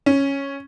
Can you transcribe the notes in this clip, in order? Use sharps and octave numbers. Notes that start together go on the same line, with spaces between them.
C#4